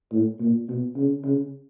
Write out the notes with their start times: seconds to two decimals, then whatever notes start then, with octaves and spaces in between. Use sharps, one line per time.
0.12 A2
0.40 A#2
0.68 B2
0.97 C#3
1.25 C#3